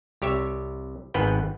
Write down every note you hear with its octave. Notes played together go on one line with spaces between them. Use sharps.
C2 G4 C#5 E5
G#1 G#2 B3 B4 G5